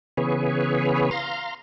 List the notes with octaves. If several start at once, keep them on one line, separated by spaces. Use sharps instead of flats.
C#3 E3 B3 G#4 B4 C#5
F5 A#5 C6